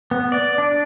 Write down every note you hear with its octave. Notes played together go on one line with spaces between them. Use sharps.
B3
D5
D4